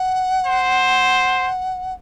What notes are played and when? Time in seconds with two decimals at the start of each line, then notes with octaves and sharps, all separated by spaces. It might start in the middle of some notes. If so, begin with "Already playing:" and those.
Already playing: F#5
0.46 C5